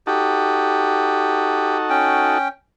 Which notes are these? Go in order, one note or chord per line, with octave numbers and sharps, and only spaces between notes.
D#4 F#4 G4 A4
C#4 G5